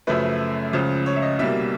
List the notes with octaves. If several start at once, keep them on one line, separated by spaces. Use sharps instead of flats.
F#2 C#3 F3 A3 B4
C#2 C#3 F3
C#5
E5
D#5
C2 B2 G3 A#3 E5